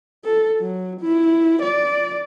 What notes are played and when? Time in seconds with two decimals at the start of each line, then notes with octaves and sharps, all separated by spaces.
0.25 A4
0.59 F#3
1.01 E4
1.62 D5